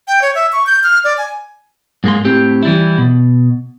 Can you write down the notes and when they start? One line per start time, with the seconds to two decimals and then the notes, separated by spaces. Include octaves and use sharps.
0.08 G5
0.22 C#5
0.35 E5
0.52 C#6
0.66 G6
0.83 F6
1.04 D5
1.18 G#5
2.04 G#2 G#3 A#3 G#4 C6
2.25 A2 C4 G4
2.63 E3 G3 E4
2.98 B2